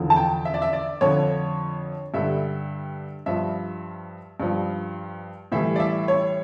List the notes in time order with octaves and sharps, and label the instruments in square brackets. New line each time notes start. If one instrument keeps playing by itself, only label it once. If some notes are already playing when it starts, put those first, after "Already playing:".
Already playing: [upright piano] E2 D3 F3
A5
G5
E5
D5
E5
D5
F2 D3 F3 C#5
G2 D3 G3 E5
G2 F3 E5
G2 F3
A2 E3 G3 E5
D5
E5
C#5